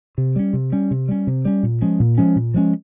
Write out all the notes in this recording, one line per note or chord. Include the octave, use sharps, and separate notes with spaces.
C3
G3 C#4
C3
G3 C#4
C3
G3 C#4
C3
G3 C#4
A#2
F3 G#3 C#4
A#2
F3 G#3 C#4
A#2
F3 G#3 C#4